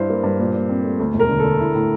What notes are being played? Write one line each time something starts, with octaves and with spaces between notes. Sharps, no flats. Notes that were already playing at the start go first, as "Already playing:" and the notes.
Already playing: G2 E4 C5
A#3
G2
A#2
A#2
C4
A3
D2
E1
A#4
D3
D3 A4
E4
A2